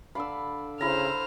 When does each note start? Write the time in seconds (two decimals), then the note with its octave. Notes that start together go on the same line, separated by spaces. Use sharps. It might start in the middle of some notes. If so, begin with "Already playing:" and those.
0.15 D3 D5 F5 B5 E6
0.81 C#3 E4 C5 A#5 F6